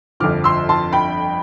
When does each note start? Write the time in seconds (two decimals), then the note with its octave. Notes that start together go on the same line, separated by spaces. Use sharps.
0.20 G1 F2 D3 F3 D6 F6
0.44 C6 E6
0.69 A5 C6
0.93 G5 B5